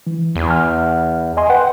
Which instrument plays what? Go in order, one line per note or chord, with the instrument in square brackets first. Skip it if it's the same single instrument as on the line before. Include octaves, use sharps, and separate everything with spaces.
[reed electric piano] E3
[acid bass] E2
[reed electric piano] F6
D#5 G#5 C6
B4 F#5 G5